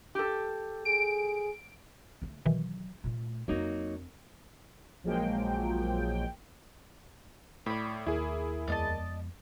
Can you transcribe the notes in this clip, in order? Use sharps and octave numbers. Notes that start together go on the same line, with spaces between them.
G4 A4
G#4 D7
D3 A3
B2 D#3 E3 F#3
A#2 A3
F2 F#3 A#3 C4 D#4
A#1 F3 F#3 G#3 A#3 G5
A2 D5 B5
D#2 E4 G#4 A#4
F2 G#3 B3 D5 D#5 A5